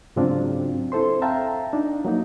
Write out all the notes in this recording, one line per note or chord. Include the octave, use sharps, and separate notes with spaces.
G#2 C#3 F#3 C4 D4 F4
C4 E4 A4 C5 C6
E5 F5 G5 A5 A#5
D4 D#4
F#3 A#3 D#4